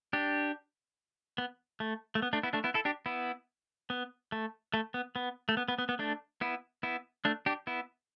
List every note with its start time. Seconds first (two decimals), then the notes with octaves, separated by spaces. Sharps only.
0.13 D4 G4
1.38 B3
1.80 A3
2.15 A3
2.22 B3
2.33 A3 D4
2.43 B3 E4
2.53 A3 D4
2.64 B3 E4
2.74 E4 A4
2.85 D4 G4
3.06 B3 E4
3.90 B3
4.32 A3
4.74 A3
4.94 B3
5.16 B3
5.49 A3
5.57 B3
5.68 B3
5.78 B3
5.89 B3
5.99 A3 D4
6.41 B3 E4
6.83 B3 E4
7.25 A3 D4
7.46 D4 G4
7.67 B3 E4